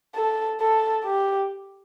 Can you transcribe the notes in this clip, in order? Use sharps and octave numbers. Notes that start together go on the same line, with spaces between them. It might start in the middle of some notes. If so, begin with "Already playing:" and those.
A4
A4
G4